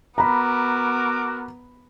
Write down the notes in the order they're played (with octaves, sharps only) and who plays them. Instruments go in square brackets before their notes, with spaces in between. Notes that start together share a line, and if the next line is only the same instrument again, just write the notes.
[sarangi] B3 [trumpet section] F#4 A#4 D6 [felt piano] A#5 B5